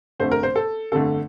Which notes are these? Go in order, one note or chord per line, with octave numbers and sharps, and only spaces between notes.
G1 F2 D3 A3 C5
A#4
C5
A4
G1 F2 D3 A3 A4